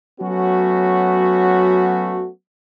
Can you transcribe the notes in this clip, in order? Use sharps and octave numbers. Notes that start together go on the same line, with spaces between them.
F#3 A3 B3 C#4 F#4